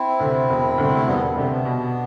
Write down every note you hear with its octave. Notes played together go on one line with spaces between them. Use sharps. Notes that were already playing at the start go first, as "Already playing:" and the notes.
Already playing: C4 E4
D2 C3
E1
D2 C3 G3
A3
E1 G3 B3
D2 C3 G3 B3
C4
B3 D4
B2